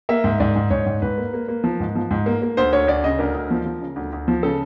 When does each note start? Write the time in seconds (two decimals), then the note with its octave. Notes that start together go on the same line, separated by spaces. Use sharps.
0.09 A#3 E5
0.24 G#2
0.40 G#2 D5
0.56 G#2
0.70 G#2 C#5
0.86 G#2
1.02 G#2 B4
1.18 A#3
1.33 A#3
1.48 A#3
1.64 F3
1.80 G#2
1.95 F3
2.11 G#2
2.26 A#3
2.42 A#3
2.57 D2 C5
2.73 D2 C#5
2.88 D2 D5
3.04 C#3 D#5
3.19 D2 A#4
3.35 D2
3.51 F3
3.66 F3
3.81 C#3
3.96 D2
4.13 D2
4.28 F3
4.43 C#3 A4